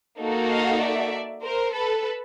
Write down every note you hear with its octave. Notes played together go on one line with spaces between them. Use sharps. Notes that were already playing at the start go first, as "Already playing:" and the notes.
A#3 D#4 F#4 A4
D#5 F5
D5 E5
A#4 C5
A4 B4